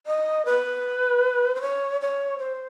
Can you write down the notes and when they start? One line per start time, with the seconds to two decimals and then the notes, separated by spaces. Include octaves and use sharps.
0.07 D#5
0.46 B4
1.55 C5
1.61 C#5
2.01 C#5
2.39 C5